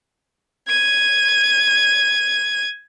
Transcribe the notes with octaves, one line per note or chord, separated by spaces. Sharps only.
G#6 D#7